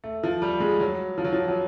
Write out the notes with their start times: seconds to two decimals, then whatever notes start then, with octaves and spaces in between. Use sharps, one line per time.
0.04 A3
0.23 F3
0.42 G3
0.60 G#3
0.80 F#3
1.18 F3
1.24 F#3
1.33 F3
1.48 F#3